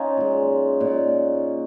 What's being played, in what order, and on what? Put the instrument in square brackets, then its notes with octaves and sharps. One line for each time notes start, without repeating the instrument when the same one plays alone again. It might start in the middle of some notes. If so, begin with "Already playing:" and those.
Already playing: [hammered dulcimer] C#4 D#4 F4
A#2 G#3
A#2